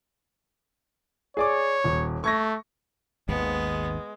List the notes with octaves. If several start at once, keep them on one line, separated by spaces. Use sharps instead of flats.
G#4 C#5 D5 D6
D#1
A3 C#6 G#6 A#6
G#1 D#2 G#2 G#3 B3